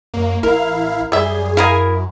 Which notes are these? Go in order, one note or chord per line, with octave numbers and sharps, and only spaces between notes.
F#2 A#3
A1 E4 A#4 F5
F#2 G3 G#4 E5
E4 A#4 F5 G#5 D#6